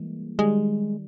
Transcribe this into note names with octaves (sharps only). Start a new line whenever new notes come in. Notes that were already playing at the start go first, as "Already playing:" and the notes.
Already playing: E3 G3 G#3 A#3
D#3 G3 G#3